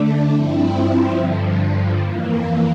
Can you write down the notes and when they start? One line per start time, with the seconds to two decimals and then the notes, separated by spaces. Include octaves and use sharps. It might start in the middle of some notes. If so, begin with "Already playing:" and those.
Already playing: D3 A3 D4
0.32 G2 F3 C4 E4
1.16 G2 D3 F3
1.99 F2 E3 A#3